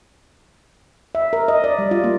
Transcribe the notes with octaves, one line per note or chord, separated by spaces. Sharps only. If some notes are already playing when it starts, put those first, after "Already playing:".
E5
A#4
D#5
D5
G3
F4
A#3